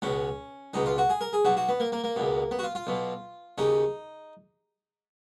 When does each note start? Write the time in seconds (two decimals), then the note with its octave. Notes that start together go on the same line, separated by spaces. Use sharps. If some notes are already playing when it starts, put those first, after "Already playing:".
0.02 C#2 B2 C#4
0.74 C#2 B2 D#4
0.86 F4
0.98 F#4
1.09 G#4
1.21 A#4
1.33 G#4
1.45 B1 B2 F#4
1.57 F#4
1.69 B3
1.80 A#3
1.92 A#3
2.04 A#3
2.16 C#2 B2
2.51 B3
2.59 F#4
2.63 F4
2.75 F4
2.87 B1 B2
3.58 D#2 C#3 D#4